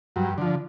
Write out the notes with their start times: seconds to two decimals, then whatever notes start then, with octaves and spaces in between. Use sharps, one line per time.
0.16 G2 F#3
0.38 D3 F3